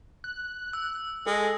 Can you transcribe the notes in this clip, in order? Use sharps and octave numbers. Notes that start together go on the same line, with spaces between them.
F#6
E6
G#3 A4